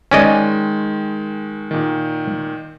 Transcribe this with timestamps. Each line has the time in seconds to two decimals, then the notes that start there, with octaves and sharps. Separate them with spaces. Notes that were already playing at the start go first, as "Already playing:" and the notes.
0.11 D#3 G#3 C#4 D5 D#5
1.71 A#2 D#3